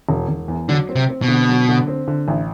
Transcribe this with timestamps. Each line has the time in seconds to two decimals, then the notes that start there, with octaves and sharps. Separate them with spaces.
0.09 E1
0.28 E1
0.48 E2
0.69 D3 F#3
0.89 C4
0.96 C3
1.09 C4
1.22 B2
1.28 D3
1.49 F#3
1.69 D3
1.88 C4
2.08 D3
2.28 A1